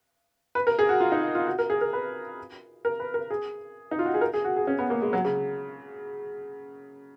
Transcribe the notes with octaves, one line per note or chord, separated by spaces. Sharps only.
B4
A#4
G#4
F#4
F4
D#4
F4
F#4
A#4
G#4
A#4
B4
A#4
B4
A#4
G#4
D#4
F4
F#4
G#4
A#4
G#4
F#4
G#4
C#4
B3
A#3
G#3
F#3
C#3